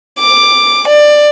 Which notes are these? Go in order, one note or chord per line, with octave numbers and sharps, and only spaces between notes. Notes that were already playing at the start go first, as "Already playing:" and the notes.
D6
D5